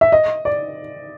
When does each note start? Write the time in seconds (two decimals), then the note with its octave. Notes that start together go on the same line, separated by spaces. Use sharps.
0.01 E5
0.12 D#5
0.45 D5